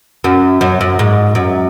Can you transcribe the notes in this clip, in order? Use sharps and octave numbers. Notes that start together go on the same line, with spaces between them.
F#2
F#2
F#2
G#2
F#2